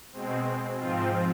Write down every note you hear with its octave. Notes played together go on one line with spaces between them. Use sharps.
B2 G#3 C4
G#2 F3 C4 F4